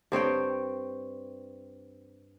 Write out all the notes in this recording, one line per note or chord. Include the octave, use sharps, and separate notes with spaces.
G2 C4 C#5 G5